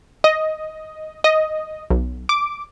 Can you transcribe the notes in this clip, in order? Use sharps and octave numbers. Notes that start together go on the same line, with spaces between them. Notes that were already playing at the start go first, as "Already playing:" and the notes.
D#5
D#5
B1
D6